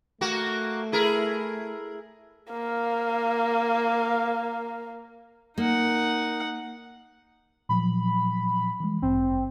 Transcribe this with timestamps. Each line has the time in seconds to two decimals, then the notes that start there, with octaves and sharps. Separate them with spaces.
0.21 A3 A#3 F#4
0.92 E4 G#4 A#4
2.51 A#3 F5
5.58 A#3 D#4 F#5
7.69 A#2 F3 F#3 B5
8.80 E3 G3 G#3
9.02 A1 G2 C4